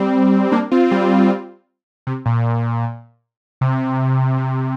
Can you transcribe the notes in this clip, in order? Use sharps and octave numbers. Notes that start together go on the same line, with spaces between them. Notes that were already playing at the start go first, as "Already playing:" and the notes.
Already playing: G3 C4
A#3 D4
C4 F4
G3 C4
C3
A#2
C3
C3